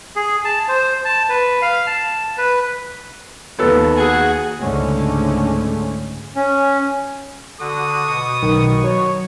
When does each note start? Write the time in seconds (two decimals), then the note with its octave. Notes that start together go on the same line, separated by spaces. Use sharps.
0.16 G#4
0.45 A5
0.68 C5
1.05 A5
1.29 B4
1.62 F5
1.87 A5
2.38 B4
3.59 D#2 B3 A4
3.96 F#4 G#4 F#5 G#5
4.60 C#2 G#2 D3 G#3 A3 C#4
6.36 C#4
7.60 D3 F#4 D#6
8.08 B2 C#6
8.43 B1 D#3
8.84 F#3 C#5